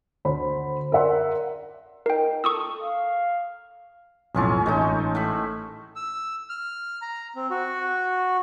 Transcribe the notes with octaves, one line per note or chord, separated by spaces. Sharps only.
D2 C5 B5
A#4 D5 E5 F#5 C6
D#4 A#4 G5
A4 C#6 D#6 E6
F5
B1 F2 A2 C#4 F4 G#4
A1 G#3 A3 D#4
A2 E5 B5
E6
F6
A#5
C4
F#4